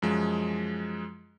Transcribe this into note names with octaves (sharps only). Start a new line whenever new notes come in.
F#2 F3 G#3